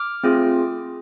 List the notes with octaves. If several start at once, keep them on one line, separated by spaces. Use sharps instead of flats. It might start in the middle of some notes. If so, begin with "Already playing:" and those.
Already playing: D6 F6
A3 C4 F4 G#4